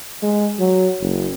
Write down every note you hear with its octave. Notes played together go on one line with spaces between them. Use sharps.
G#3
F#3
F#1